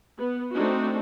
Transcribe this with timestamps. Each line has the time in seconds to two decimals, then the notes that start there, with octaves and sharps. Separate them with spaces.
0.18 B3
0.53 A3 C4 D4 D#4 F#4